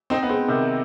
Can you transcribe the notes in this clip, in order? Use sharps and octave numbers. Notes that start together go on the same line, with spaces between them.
C4 D#4
B3
G#3 C4
C3 D#3